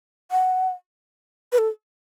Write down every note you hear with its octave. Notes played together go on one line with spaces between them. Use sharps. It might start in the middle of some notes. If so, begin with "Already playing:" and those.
F#5
B4
A4